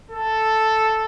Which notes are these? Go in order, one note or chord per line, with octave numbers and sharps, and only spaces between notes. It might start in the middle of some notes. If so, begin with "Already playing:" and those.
A4